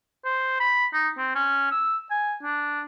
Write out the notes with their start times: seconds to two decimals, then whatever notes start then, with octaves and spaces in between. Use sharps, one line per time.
0.25 C5
0.60 B5
0.93 D#4
1.18 C4
1.35 C#4
1.72 E6
2.11 G#5
2.43 D4